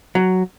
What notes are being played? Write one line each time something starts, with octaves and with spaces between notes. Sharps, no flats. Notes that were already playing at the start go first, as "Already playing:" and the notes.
F#3